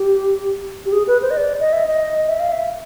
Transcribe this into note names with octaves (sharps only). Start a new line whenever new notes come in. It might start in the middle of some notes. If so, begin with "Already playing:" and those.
Already playing: G4
G4
G#4
B4
C5
D#5
D5
D#5
E5
D#5
E5
F5
E5